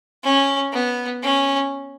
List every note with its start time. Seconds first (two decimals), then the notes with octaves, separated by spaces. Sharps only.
0.24 C#4
0.73 B3
1.23 C#4